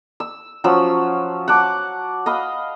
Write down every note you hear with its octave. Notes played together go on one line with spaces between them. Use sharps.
E6
F3 F#3 C#4 E6
F#5 A5 D6
D#5 F5 B5